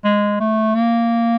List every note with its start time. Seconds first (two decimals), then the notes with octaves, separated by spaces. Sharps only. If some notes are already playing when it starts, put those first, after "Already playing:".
0.05 G#3
0.40 A3
0.75 A#3